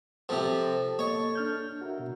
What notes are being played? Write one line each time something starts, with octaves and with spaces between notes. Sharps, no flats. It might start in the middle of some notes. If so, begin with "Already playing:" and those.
C3 F3 A4
A#3 C#5 D#5
D4 F6 G6
F#4 A#4 E5
B2